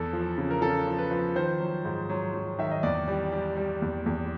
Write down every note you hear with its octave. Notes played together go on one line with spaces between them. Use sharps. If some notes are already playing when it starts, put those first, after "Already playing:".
Already playing: E2 A4
F3
C#3
A#4
C#3 A4
F3
B4
F3
D#3 C5
F#3
G#2
F#3
F#3
D#3 E5
D#5
E2 D5
G3
G3
G3
E2
E2